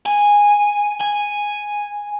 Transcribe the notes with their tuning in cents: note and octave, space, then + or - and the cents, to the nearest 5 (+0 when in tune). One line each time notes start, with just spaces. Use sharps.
G#5 -10
G#5 -5